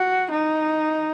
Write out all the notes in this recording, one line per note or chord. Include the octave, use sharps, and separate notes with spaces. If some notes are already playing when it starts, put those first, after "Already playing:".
Already playing: F#4
D#4